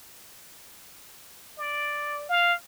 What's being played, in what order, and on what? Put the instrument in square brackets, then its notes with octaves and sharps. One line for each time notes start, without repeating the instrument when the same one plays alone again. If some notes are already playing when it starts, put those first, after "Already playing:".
[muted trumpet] D5
F5